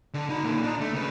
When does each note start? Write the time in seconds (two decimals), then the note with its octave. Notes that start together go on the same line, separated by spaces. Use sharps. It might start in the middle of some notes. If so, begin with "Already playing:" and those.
0.14 D3
0.29 D#4 B5
0.43 A#2 D3
0.64 D4 D#4
0.81 A3
0.93 C#3 B4